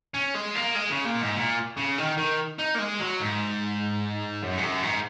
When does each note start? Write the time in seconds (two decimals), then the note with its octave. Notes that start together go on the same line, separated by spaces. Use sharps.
0.14 C#4
0.34 G#3
0.55 A#3
0.75 G#3
0.91 C#3
1.05 A#2
1.21 G#2
1.36 A#2
1.77 C#3
1.98 D#3
2.18 D#3
2.59 D#4
2.75 A#3
2.79 G#3
3.00 F#3
3.20 G#2
4.42 F#2
4.57 G#2
4.62 F#2
4.83 G#2